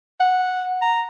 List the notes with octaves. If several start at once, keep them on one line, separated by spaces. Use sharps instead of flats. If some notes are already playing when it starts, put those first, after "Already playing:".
F#5
A#5